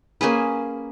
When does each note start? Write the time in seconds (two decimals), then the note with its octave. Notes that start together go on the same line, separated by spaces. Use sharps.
0.21 A#3 C#4 G#4 B4